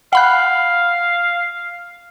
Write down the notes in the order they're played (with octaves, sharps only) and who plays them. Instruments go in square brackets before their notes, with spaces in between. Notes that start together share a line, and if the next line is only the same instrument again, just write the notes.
[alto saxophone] F5 [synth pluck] F#5 B5 F#6